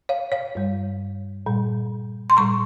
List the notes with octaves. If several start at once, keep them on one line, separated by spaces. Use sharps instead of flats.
C#5 F5
C#5 F5
G2 G3
A#2 G3
C6
A#2 G3 A#5 C#6